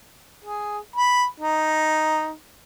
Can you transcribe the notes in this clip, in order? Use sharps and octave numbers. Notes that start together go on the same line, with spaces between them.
G#4
B5
D#4